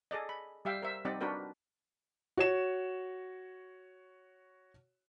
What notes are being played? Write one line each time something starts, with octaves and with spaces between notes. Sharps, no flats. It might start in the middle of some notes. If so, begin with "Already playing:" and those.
G#4 A4 D5 D#5
B5
G3 G4 E5 F5 G5
A#4 C5 E5
G3 C4 D#4 D5 D#5 F#5
D4 F#4 A#4 B4 G5
F#4 C#5 E7